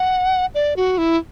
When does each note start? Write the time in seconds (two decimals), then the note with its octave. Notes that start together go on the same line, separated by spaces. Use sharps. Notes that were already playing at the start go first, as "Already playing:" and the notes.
Already playing: F#5
0.55 D5
0.76 F#4
0.98 E4